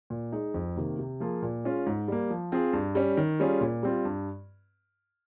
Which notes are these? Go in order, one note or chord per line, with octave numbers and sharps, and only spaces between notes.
A#2
G#3 D#4 G#4
F2
C3 D#3 A#3
C3
F3 A#3 F4 G#4
A#2
G#3 C#4 F4
G#2
G3 A#3
F3
C4 F4 G#4
G2
G3 C#4
D#3
G3 C#4 F4 G#4
A#2
G3 C4 F4
G2